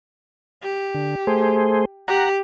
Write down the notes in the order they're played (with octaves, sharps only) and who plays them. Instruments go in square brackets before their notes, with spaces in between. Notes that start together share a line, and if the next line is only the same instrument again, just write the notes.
[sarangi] G4
[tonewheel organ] D3
A3 G#4 C5
[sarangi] G4 [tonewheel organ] F#5 A#5